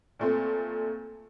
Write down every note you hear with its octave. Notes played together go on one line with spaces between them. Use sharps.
A#2 A3 C4